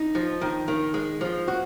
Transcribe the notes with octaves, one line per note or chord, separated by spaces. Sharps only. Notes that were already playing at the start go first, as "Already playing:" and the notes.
Already playing: D#4
F3
D#3
D#3
G#3
F3
F#4